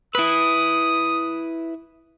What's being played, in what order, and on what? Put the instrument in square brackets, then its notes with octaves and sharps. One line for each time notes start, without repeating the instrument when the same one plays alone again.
[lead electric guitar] E4 B4 [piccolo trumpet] D#6